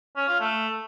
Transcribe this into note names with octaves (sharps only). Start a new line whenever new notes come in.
C#4
F4
A3